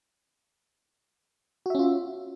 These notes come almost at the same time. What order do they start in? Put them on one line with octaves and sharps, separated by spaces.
F#4 E5 C#4 F4